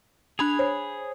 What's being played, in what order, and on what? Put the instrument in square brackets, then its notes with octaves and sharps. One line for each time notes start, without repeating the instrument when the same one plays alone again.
[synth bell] D4 G#6 F7 [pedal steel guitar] G#4 B5 F#6
[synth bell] C5 C#5